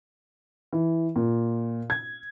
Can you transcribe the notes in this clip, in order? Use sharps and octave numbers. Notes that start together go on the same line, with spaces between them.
E3
A#2
G#6